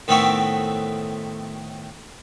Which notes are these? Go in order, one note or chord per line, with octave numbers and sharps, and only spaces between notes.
A2 D#3 B3 C4 E5 C#6